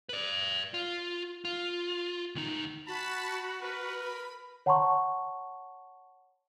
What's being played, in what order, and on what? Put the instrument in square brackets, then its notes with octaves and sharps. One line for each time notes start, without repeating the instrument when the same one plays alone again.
[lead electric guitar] B4 D5
F4
F4
D2 D#4
[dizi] F#4 [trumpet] A5 [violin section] B5
[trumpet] A#4 [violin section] B4
[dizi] B5
[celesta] C#5 F#5 A5 A#5 C6 C#6